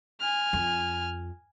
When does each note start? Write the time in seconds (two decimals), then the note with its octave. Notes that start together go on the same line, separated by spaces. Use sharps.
0.20 G#5 F6
0.53 F2